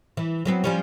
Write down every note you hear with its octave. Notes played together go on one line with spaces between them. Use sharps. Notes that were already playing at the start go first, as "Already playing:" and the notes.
E3
F#3 B3 C4
F3 G3 C#4